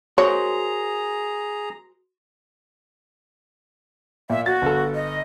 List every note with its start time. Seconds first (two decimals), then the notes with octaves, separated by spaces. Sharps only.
0.18 F#4 G#4 A#4 C5 C#5 A#5
4.30 A#2 E5
4.46 F#4 A6
4.62 G1 A4
4.95 D#5